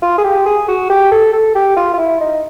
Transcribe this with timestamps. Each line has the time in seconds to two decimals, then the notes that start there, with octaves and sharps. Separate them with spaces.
0.02 F4
0.18 G#4
0.24 G4
0.46 G#4
0.68 F#4
0.90 G4
1.11 A4
1.33 A4
1.55 G4
1.77 F4
1.94 F4
1.98 E4
2.20 D#4